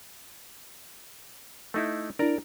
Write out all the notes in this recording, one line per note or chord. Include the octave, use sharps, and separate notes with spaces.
A3 D#4 E4
D4 E4 A#4 D5 A#5